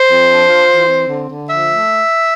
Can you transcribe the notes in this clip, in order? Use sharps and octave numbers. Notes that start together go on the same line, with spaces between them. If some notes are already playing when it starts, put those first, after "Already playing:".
Already playing: C5
F2
D4
F4
E3
C4
D3
D3
F3 E5
A3